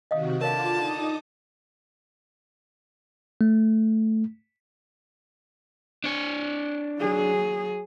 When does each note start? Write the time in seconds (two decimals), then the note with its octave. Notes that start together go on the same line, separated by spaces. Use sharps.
0.11 C3 D#3 F#4 D#5 F5 D#6
0.41 D3 F4 A#4 C#5 F5 A5 D6
0.78 D#4 D6 D#6
3.41 A3
6.04 D4 C#5
7.00 F#3 G#4